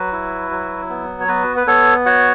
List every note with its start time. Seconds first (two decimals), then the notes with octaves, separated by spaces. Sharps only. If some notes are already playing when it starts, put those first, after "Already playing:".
Already playing: F#3 F#4 B4
0.12 E4
0.51 F#3
0.89 B3
1.20 C#5
1.28 B3 F#4 B4
1.57 B4
1.67 B3 A4 C#5
2.06 F#4 C#5 F#5